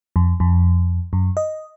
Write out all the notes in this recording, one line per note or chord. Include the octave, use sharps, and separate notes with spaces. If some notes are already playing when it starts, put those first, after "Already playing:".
F2
F2
F#2
D#5